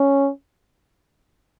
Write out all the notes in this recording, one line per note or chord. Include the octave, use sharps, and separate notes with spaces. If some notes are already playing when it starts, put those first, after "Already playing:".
Already playing: C#4